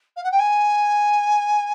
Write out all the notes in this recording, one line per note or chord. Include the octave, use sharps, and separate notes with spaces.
F5
F#5
G5
G#5